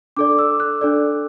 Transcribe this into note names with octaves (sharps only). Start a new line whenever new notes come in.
D4 A4 D5 D6
E6
F#6
D4 A4 D5